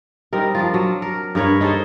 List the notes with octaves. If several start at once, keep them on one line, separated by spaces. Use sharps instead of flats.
G3 C4 D#4 A#4
F3 D4 F4
F#3
A#4
G2 A#4 B4 C#5
D#4 G#4 A4 C5